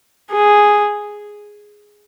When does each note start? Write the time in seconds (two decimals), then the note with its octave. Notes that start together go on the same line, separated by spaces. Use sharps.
0.31 G#4